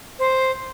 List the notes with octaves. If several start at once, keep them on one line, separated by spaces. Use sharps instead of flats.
C5